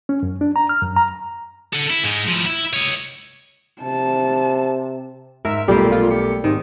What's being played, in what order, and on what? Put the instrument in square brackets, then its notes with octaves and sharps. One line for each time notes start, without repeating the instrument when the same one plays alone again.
[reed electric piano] C#4
F#2
D4
A#5
F6
F#2
A#5
[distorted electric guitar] A4 F#5
E4
G#2 G#3
F3 E4
E4
C#5 D#5
[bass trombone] C3 [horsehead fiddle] A5
[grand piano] G#2 [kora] A#4 [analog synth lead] E5
[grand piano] B1 A3 [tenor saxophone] A#2 [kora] G3 A#3 [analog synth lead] G4
[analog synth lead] F4
[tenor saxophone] G4 [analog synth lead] C#7
[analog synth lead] G#2 [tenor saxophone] C3 [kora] D#3